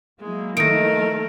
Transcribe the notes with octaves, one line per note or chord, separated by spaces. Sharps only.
F#3 G#3 A#3 E4
D#3 A3 A#4 A#6 D7